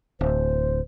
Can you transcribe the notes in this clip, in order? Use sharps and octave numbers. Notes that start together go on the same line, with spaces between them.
D1 C5